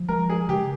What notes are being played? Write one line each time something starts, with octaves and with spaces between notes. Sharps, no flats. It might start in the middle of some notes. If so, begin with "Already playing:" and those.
Already playing: F3
G#3 A#4
G#4
C#3 G4